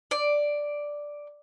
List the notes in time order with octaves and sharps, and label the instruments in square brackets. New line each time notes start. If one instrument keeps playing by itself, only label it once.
[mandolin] D5